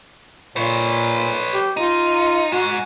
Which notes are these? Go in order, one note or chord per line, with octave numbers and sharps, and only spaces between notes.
A#2 B4 C#5
G4
D#4 F4
G#2 F#4